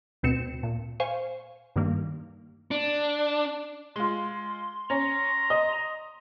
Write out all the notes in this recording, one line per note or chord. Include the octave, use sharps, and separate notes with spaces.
D2 B2 C4 C#7 E7
A#2
C5 F5 G#5 C#6
G2 D#3 A#3
D4
G#3 F4 C6
C#4 A#5
D#5